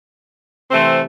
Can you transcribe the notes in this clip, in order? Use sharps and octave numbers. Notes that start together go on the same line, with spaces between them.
C3 E3 A3 C4